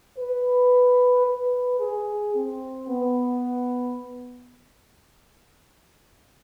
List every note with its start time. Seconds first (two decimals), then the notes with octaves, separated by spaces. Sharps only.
0.18 B4
1.25 B4
1.79 G#4
2.35 C4
2.88 B3